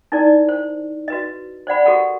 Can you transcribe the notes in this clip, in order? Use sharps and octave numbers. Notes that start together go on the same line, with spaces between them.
D#4 E4 A#4 D5
C5
F#4 B4 D#5
C5 D5 F#5 B5
F#4 G4 A4 A#4 F#5